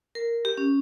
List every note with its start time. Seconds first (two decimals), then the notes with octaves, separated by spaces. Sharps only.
0.15 A#4
0.45 G4
0.57 C#4